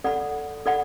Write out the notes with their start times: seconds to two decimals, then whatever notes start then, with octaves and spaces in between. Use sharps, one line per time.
0.04 A4 D5 F#5 B5
0.66 A4 D5 F#5 B5